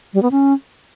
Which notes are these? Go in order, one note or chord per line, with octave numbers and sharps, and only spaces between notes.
G3
B3
C#4